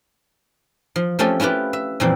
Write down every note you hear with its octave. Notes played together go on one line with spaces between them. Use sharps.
F3
F3 A3 C4 C#4 G4 A4
C#4 E4 F4 G4 B4
E5
F2 A#2 E3 G3 C4